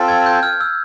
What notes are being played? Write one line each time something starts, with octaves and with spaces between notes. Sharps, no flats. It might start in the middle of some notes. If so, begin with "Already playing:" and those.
Already playing: C4 F4 A4
G#6
G6
F6
E6